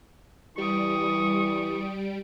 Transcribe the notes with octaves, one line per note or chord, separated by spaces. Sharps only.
E3 G3 C#6 D#6 D7